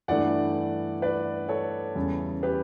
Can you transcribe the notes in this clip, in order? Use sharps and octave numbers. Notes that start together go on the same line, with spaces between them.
G2 E3 A3 D5 F#5
B4 D5
A4 C#5
E2 C#3 G3
G4 B4